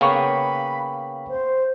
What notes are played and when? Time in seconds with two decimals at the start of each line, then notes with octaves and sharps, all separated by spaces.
0.01 C#3 A#3 B3 F5 G5 B5 C#6
1.29 C5